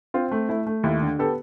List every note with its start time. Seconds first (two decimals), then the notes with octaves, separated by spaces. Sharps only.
0.14 C4 F4
0.31 A3
0.49 A3 E4
0.66 A3
0.83 D#2 E4
1.01 D3
1.19 B3 G4 A4